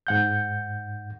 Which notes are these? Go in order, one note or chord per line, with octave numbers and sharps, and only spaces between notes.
G#2 F#5 G6